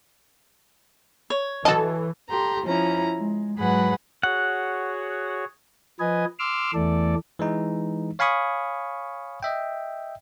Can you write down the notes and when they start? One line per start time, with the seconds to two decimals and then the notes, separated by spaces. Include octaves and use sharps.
1.30 C#5
1.65 E3 F#4 A4 D#5 A5
2.30 G4 A4 A#5 C6
2.65 F3 C#4 E4 A#5
3.18 G#3
3.58 G#2 F#3 G#4 B4 F#5 B5
4.23 F#4 G#4 C#5 F#5
6.00 F3 B4 D#5 G#5
6.39 C6 D6 E6 F6
6.74 E2 E3 A3 A4 D5
7.39 E3 G#3 D#4
8.19 C#5 F5 G#5 B5 C#6 D#6
9.43 D#5 E5 G5